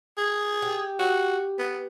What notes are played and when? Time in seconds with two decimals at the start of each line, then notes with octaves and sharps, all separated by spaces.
0.17 G#4
0.62 G4
0.99 F#4
1.59 B3